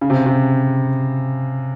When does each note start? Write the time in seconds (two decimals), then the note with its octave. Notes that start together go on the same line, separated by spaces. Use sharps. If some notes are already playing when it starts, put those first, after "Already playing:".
0.01 C#3
0.10 C3
0.26 C3